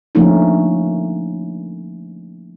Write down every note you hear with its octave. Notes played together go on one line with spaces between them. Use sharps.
D3 F3 A3 A#3 C#4 D#4